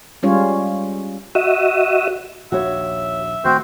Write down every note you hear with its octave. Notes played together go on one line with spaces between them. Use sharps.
G3 G#3 C#4 F4 C#5
F#4 D#5 E5
A#1 D#2 F#4 C#5 E5
D1 D#3 A3 C4 F#4 C5